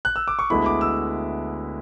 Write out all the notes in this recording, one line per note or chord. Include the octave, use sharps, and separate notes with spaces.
F#6
E6
D6
C#6
D2 D3 G#3 B3 E4 B5
D6
E6